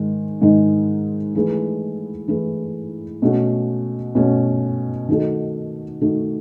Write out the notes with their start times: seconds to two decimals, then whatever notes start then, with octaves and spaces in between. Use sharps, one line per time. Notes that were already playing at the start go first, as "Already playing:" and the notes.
Already playing: G#2 D#3 G#3
0.41 G#2 D#3 G#3 D#4
1.35 E3 A3 E4 G#4 B4
2.28 E3 A3 E4 G#4 B4
3.22 B2 A3 C#4 F#4
4.15 B2 A3 C#4 F#4
5.09 D#3 A3 D#4 F#4 A4
6.01 D#3 A3 D#4 F#4 A4